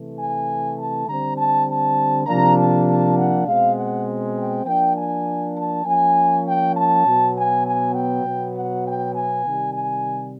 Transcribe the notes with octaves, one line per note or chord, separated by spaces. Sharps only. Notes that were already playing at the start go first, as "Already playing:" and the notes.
Already playing: C3 E3 A3
G#5
A5
D3 G3 C4 A#5
A5
A5
C3 F3 A#3 D4 A#5
A5
A5
F#5
B2 G#3 C4 F5
F#5
G5
F3 A#3 D4 G5
G#5
A5
F3 A#3 C#4 G#5
G5
A5
B2 F#3 B3
G#5
G#5
G5
B2 F#3 B3
F#5
G5
G#5
C3 D#3 G3
G#5